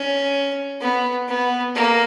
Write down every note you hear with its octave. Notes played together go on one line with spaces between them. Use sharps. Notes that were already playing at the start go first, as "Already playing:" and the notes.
Already playing: C#4
B3
B3
A#3